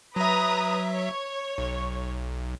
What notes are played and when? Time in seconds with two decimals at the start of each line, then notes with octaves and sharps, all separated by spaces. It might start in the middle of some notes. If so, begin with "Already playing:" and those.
0.16 F#3 B4 E5 A#5 D#6
0.91 C#5
1.58 B1